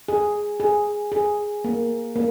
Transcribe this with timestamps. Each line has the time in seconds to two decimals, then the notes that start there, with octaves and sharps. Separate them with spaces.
0.08 G#4
0.60 G#4
1.12 G#4
1.65 A#3
2.16 A#3